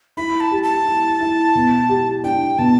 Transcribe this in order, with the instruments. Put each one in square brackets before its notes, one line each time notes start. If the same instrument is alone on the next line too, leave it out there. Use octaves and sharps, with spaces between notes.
[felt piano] E4 [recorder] B5
[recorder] A5
[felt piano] G4
[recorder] A5
[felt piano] E4
E4
B2
G4
[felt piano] D4 [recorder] G5
[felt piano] B2 [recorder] A5